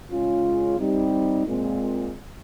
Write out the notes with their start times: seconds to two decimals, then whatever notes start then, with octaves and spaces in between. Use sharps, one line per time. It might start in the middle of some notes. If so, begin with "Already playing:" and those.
0.11 C#3 G#3 C#4 F4
0.78 G3 C4 D#4
1.46 A#2 G#3 C4